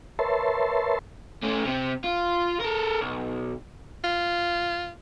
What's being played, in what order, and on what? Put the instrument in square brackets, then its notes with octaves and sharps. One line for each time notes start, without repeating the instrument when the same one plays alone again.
[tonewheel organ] A#4 B4 C#5 E5 A5 C6
[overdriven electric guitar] A3 C#4
C3 C4
F4
A4 A#4
B1
[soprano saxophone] F4